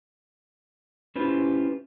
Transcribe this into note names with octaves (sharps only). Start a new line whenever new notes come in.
C#4 E4 F4 G4 B4 C5